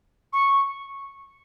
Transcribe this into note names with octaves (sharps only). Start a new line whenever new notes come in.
C#6